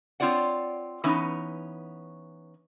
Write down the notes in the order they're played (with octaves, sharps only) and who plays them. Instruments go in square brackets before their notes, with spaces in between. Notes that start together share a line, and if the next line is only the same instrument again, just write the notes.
[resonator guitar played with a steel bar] C4 F4 C#5 D5 F#5
E3 B3 C#4 D#4